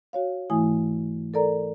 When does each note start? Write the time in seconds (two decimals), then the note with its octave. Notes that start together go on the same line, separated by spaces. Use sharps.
0.13 F#4 C#5 F5
0.50 G#2 E3 A3 E4 G#5 D#6
1.34 A4 A#4 D5 A#5